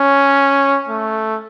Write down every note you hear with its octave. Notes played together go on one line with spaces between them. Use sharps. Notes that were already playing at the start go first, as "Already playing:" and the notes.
Already playing: C#4
A3